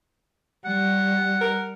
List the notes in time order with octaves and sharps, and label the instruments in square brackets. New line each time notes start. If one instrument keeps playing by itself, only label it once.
[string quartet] G3 [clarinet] F#5
[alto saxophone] A#4